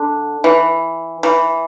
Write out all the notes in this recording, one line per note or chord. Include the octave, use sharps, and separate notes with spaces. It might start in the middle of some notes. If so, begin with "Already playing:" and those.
Already playing: D3
E3
E3